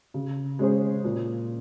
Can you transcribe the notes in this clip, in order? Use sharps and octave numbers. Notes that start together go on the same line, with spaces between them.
C#3
G#3 C#4 G#4 C5
A#2